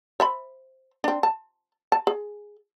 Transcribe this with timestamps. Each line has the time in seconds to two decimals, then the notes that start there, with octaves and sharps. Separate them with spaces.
0.20 C5 E5 B5
1.04 C4 D4
1.23 A5
1.92 A5
2.07 G#4